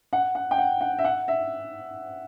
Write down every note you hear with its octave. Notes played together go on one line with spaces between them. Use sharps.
F#5
F#5
G5
F#5
F#5
E5
F#5
E5